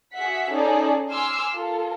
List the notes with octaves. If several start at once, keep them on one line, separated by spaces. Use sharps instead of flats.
F#4 G#4 E5 F#5 B6
C#4 D#4 G#4 A4 D5
G#5 C6 D6 E6 F6
F4 A4 A#4